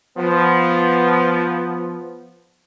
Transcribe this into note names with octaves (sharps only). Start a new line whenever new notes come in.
F3 B3